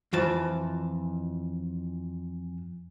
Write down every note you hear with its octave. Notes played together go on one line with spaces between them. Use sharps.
F2 E3 A5